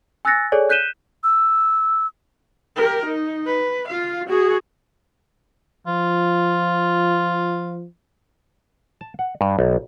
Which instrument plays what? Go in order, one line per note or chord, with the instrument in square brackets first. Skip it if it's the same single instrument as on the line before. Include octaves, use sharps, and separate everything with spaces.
[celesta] G#5 E6 F#6 A6 A#6 C#7
G#4 A4 C#5 D5 G#5
F#6 G6 B6 D#7 E7 G7
[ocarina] E6
[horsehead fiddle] G4 A#4
D#4
B4
F4 F5
F#4 G#4
[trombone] F3 [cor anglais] F4
[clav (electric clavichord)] A5
F#5
G2
B1